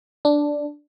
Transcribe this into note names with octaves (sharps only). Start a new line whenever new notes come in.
D4